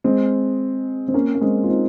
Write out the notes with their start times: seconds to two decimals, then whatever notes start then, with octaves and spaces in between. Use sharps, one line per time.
0.04 G#3 C4
1.08 C4
1.14 A#3 C#4
1.35 A#3
1.41 G#3 C4
1.63 F4
1.69 C4 D#4